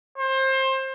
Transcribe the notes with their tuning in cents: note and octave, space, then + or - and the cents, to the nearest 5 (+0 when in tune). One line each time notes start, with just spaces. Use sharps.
C5 +25